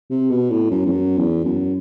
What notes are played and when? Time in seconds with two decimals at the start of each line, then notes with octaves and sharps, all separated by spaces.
0.10 C3
0.30 B2
0.50 A2
0.71 F#2
0.86 E2
0.91 F#2
1.18 E2
1.44 F#2